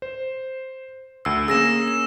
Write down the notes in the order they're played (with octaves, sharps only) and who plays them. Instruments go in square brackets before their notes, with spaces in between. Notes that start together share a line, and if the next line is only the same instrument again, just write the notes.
[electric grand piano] C5
[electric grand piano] D2 C7 [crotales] E6
[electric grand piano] A#3 C#4 G#4 [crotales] E6 A#6 E7
[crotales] E7